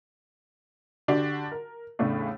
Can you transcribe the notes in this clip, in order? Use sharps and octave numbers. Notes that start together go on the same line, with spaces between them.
D3 D4 F#4 G4
A#4
E2 A2 C#3 A3 D4